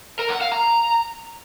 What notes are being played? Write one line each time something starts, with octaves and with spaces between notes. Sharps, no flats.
A#4
F#5
F5
A#5